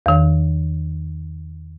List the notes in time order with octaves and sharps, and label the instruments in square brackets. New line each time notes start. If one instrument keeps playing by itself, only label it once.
[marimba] E2 D#3